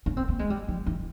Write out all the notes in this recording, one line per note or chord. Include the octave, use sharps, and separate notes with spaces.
C#4
C4
A#3
G#3
G3
F3
E3